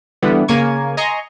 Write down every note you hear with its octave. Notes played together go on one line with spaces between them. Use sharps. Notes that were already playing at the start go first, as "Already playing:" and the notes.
D3 E3 G3 B3
C#3 A#3 G#5 C#6 G#6
D#5 G#5 A#5 C6 C#6 D#6